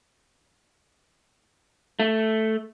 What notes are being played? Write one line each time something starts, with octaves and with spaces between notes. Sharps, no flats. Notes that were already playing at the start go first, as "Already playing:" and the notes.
A3